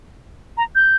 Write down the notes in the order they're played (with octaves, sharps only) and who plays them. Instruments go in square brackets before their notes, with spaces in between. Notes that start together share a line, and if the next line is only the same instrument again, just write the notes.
[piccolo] A#5
G6